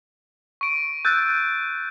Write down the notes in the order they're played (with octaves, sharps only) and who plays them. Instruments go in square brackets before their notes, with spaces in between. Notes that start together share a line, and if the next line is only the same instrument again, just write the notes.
[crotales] C#6 D7
[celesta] E6 F#6 A6 [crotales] G6